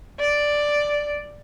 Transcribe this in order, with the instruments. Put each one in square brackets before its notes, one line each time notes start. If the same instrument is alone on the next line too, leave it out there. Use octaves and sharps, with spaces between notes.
[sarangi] D5